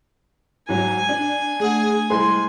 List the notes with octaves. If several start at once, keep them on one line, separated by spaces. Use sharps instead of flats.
G#1 F#3 G#5
D4
A3 G#4 F#5
C2 G#3 G#4 C5 C6